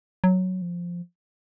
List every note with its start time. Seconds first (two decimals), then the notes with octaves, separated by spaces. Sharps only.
0.24 F#3
0.62 F3